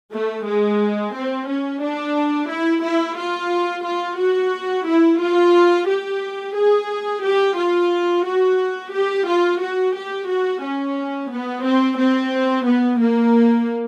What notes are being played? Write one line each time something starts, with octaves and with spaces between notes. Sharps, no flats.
A3
G#3
C4
C#4
D4
E4
E4
F4
F4
F#4
E4
F4
G4
G#4
G4
F4
F#4
G4
F4
F#4
G4
F#4
C#4
B3
C4
C4
B3
A#3